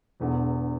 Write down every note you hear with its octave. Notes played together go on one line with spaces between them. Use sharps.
E1 E2 D3